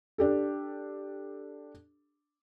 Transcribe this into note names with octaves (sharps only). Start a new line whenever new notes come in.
D4 G4 A4